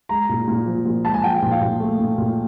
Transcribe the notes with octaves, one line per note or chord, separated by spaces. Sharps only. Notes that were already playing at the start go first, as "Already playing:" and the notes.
G#3 A#5
A#2
A#2
F3
A#2
G#3 A5
G#5
F3 G5
A#2
F5
A#2
A3
A#2
A#2